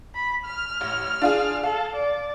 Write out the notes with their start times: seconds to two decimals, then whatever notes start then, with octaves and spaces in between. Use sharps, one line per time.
0.15 B5
0.45 F6
0.81 A1
1.22 D4 F4 G#4
1.63 A4 F5
1.94 D5